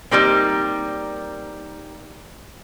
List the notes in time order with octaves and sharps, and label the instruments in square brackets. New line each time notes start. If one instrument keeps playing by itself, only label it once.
[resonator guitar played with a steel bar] D#3 F#3 G3 A#3 C4